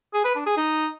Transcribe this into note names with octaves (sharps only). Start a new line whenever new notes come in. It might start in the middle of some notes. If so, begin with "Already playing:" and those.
G#4
B4
D4
G#4
D#4